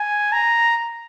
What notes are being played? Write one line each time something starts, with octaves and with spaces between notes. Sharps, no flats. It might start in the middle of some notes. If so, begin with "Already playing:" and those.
Already playing: G#5
A#5